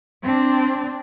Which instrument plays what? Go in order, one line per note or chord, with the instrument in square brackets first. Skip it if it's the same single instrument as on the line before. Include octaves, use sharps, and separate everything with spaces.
[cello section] C4 D4